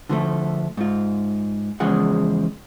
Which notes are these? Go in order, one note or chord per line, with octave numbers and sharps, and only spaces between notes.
D3 F3 G#3 A3
G#2 F4
E2 C#3 F3 G#3 F#5